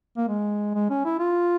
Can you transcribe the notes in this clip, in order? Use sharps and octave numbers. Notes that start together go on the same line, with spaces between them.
A#3
G#3
G#3
C#4
E4
F4